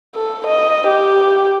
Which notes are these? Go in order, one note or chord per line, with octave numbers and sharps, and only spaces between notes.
A4
D#5
G4